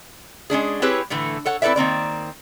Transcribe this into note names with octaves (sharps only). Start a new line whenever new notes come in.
G#3 C#4 D4 G#4
C4 E4 G4 G#4 B4 C#5
A2 D3 E3 A3
A4 C#5 F#5
C4 E4 A4 B4 D5 E5
D#3 A#3 C4 D5